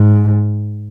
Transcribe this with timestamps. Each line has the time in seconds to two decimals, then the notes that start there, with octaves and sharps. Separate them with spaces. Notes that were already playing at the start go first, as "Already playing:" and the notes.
Already playing: G#2